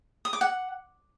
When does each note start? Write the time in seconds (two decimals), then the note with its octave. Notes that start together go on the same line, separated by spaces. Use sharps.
0.25 D#6
0.33 D6
0.41 F#5